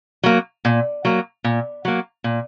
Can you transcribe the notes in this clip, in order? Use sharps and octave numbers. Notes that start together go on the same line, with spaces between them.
F#3 A#3
A#2
F#3 A#3
A#2
F#3 A#3
A#2